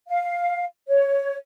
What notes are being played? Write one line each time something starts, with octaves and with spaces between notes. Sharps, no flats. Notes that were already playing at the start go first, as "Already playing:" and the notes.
F5
C#5